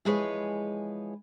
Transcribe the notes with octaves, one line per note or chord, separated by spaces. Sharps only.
E3 F3 G#3 G#4 B4 C#5